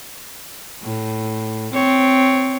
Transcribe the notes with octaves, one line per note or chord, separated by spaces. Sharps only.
A2
C4 C#5